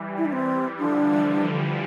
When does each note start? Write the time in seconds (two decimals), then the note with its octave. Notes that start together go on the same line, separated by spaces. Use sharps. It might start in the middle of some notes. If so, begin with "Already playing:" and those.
Already playing: E3 G3
0.17 E4
0.25 D4
0.32 E3 G3 C4
0.79 D3 F3 D4
1.10 E3 G3
1.42 E3 G3